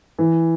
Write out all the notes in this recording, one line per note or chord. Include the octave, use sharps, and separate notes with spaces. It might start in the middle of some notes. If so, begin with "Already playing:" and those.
E3